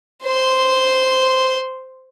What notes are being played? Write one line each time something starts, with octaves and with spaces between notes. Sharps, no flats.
C5 C6